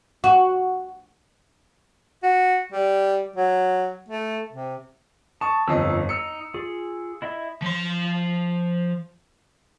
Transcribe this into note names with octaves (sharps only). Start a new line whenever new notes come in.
F#4
F#4
G3
F#3
A3
C3
A5 C#6 D#6
G1 F2 D#4 D#5 F5 E6
D#4 E6 C#7
F4 G#4
E4 D#5 E5
F3 C6